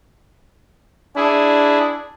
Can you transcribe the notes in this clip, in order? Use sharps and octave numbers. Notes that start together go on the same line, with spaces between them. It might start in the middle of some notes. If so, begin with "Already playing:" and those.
D4 E4 G#4